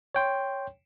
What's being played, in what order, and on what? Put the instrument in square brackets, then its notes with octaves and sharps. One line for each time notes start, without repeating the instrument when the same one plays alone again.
[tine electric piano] C#5 G5 C6